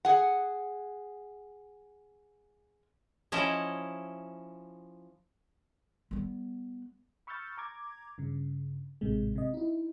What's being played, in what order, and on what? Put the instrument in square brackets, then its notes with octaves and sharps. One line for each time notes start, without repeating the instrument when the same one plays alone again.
[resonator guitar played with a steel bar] G#4 F#5
[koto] F3 C#4 E4 D#5
[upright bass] G3 B3
[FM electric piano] B5 C#6 E6 F6 G6 A6
A#5 D6 G#6
G2 C#3
A1 G#2 C3 G#3
C3 D#5
D#4 E4